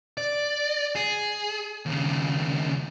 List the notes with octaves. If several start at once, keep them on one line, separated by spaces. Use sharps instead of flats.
D5
G#4
D#2 C#3